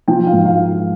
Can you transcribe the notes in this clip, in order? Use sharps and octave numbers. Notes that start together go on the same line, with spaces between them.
F3 G5
F5
G#2
F5